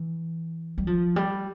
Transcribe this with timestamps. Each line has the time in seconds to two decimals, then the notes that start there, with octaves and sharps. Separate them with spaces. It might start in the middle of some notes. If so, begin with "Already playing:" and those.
Already playing: E3
0.78 G3
0.87 F3
1.16 G3